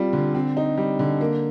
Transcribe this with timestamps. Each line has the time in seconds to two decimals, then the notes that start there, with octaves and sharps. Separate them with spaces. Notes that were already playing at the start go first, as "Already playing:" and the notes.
Already playing: G3 C4 F4
0.13 D3
0.35 C4
0.57 D#4
0.77 G3
0.99 D3
1.21 A#3